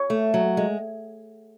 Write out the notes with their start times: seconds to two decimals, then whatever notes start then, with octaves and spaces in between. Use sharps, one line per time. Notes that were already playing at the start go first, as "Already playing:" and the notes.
Already playing: C#5
0.10 A3
0.34 F#3
0.57 G#3